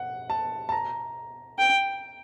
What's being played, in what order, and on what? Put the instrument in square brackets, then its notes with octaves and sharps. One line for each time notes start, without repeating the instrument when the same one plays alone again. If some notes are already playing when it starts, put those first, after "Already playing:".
Already playing: [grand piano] F#5
A5
A5
A#5
[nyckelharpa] G5